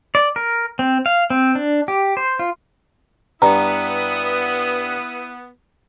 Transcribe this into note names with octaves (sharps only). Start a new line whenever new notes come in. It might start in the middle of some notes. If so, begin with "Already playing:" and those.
D5
A#4
C4
F5
C4
D4
G4
C5
F4
G2 B3 E4 B4 A#5 D#6